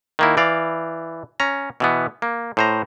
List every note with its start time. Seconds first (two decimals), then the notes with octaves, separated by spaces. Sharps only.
0.19 D#3 A#3 E4
0.37 E3 D5 F5
1.40 C#4 A#5
1.80 B2 E3 B3
2.22 A#3
2.57 A2 C5 A#5